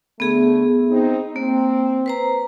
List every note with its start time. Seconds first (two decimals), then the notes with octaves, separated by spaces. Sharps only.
0.20 D3 A3 B3 G#4
0.90 C4 D#4
1.36 A#3 C4
2.06 B4 C5 A#5